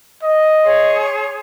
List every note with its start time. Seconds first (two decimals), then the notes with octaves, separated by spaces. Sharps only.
0.23 D#5
0.64 G#4 C#5 C6